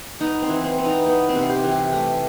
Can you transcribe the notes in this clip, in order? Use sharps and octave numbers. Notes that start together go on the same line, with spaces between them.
B3 D#4
C4
E3
C4
B3
D#4
B3
C4
C3 B3
C4
G4
E3
G4
A3